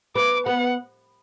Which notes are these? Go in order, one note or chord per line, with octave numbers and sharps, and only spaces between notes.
B3 D6
B3 F#5